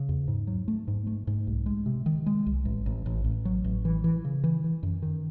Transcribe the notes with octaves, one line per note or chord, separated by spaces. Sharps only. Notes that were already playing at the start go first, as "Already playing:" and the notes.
Already playing: C#3
E2
G#2
F#3
A3
G#2
A3
G#2
C2
G#3
C3
D#3
G#3
C2
A1
A1
A1
A1
F#3
A1
E3
E3
C#3
E3
E3
F#2
D#3